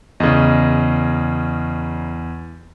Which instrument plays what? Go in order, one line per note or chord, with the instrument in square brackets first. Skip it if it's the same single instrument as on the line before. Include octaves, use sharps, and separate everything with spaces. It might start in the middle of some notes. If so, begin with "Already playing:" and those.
[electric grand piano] E2 [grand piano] C#3 D#5